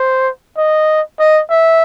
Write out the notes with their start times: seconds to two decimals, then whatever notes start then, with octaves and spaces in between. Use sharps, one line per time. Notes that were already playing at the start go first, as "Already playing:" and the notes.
Already playing: C5
0.57 D#5
1.20 D#5
1.50 E5